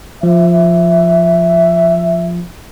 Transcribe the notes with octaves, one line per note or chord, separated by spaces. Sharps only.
F3 E5